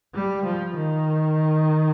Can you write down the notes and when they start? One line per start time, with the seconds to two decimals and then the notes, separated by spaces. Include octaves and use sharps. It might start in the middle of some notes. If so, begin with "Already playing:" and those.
0.15 G3
0.45 F3
0.75 D#3